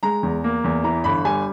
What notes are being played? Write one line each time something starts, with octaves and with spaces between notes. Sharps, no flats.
G#3 A#5
E2
A#3
E2
E3 A#5
G1 B5
G3 G#5